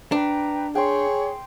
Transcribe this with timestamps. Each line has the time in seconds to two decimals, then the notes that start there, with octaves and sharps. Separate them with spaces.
0.12 D4 B4 G5 A#5
0.75 G#4 C#5 G5 C6